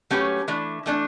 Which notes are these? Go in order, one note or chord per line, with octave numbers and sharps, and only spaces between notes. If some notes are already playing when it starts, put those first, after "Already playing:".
F#3 A3 C#4 G4 B4
E3 A3 D4
E3 A3 D4